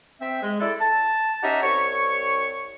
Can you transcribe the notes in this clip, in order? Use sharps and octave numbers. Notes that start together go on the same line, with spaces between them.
C4 E5
G#3
E4 A4 D5
A5
C#4 D#4 G4 E5 F#5 A#5
C2 C#5 C#6